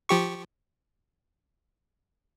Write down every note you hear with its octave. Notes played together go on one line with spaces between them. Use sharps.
F3 G4 C#6